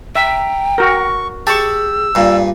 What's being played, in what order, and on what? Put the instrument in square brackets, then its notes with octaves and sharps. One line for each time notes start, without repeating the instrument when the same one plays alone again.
[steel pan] E5 [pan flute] G5 [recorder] A#5
[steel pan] F#4 A#4 [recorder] C#6
[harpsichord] G4 [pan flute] G#4 [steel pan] A5 C#6 [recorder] E6
[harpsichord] G2 A#2 [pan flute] D5